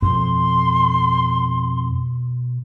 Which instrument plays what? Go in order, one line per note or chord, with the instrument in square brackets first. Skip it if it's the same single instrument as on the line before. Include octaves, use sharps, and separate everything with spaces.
[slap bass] F2 [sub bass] B2 [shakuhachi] C6